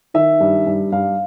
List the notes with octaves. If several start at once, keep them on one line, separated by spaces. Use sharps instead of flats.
D#3 E5
G2
G2
G2 F5